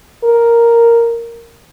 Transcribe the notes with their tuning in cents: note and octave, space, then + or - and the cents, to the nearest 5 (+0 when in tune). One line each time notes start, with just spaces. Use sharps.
A#4 +0